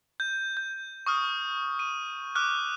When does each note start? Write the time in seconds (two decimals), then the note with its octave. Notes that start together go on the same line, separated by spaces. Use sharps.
0.20 G6
0.57 G6
1.06 C#6 D#6 F6
1.79 D#7
2.35 D6 F6 F#6